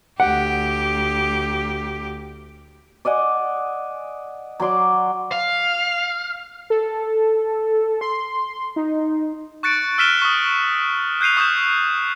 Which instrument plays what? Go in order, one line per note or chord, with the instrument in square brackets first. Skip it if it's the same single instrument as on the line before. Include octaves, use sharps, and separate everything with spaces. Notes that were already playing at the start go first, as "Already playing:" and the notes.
[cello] D2 G4 [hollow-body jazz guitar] F#5
[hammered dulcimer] D5 D#5 F#5 G#5
F#3 D5 C6 D6
[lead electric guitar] F5
[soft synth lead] A4
C6
D#4
[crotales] C#6 F#6 A6 C#7 D7
E6 F6 B6 D#7 E7 G7
C#6 D#6
F#6 G6 C7 D#7 F7
C#6 D#6 F6 G6 E7